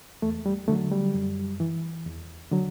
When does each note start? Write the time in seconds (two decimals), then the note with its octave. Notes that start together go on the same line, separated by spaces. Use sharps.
0.22 E2 A3
0.46 G3
0.68 D3 F#3 A3
0.92 G3
1.14 F#2
1.60 E3
2.06 E2
2.52 D3 F#3